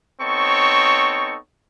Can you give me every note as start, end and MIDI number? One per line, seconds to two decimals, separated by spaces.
0.21 1.36 59
0.21 1.36 60
0.21 1.36 63
0.21 1.36 69
0.21 1.36 73
0.21 1.36 85